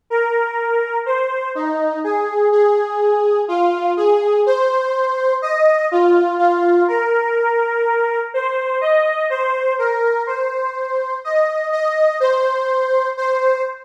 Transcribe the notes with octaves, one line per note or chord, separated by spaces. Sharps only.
A#4
C5
D#4
G#4
G#4
F4
G#4
C5
D#5
F4
F4
A#4
C5
D#5
C5
A#4
C5
D#5
D#5
C5
C5